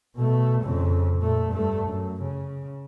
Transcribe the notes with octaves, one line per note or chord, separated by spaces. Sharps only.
B2 A3
F2 C#3
A#2 A3
G2 A3
F#2
C#3